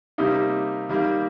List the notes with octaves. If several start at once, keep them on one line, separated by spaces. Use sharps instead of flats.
C3 G3 A#3 D#4
D#3 G3 A#3